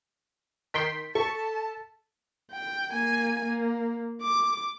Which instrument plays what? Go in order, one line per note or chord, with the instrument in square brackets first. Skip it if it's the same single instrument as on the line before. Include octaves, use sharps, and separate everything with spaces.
[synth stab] D#3 G5 C6 [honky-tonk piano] B6
[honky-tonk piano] A4 [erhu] A5 [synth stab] C#6
[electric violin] G5
A#3 G#5
A#3
D6